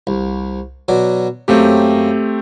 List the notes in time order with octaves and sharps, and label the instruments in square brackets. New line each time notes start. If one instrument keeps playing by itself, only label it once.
[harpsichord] C2
B2 F#3 D5
[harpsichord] F#2 A#3 C#4 [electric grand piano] A3 C4 G4